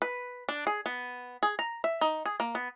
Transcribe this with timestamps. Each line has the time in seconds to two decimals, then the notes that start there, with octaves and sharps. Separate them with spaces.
0.02 B4
0.49 D4
0.67 G#4
0.86 B3
1.43 G#4
1.59 A#5
1.84 E5
2.01 D#4
2.26 G#4
2.40 A#3
2.55 B3